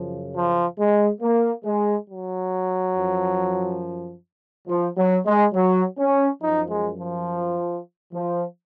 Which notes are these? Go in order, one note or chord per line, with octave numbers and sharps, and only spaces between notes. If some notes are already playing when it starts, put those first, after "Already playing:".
Already playing: F#2 C#3 F3
F3
G#3
A#3
G#3
F#3
F#2 F3
F3
F#3
G#3
F#3
C#4
F#2 F3 D#4
G#3
F3
F3